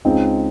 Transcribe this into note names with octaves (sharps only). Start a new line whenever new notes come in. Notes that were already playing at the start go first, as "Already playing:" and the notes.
C#2 C4 D#4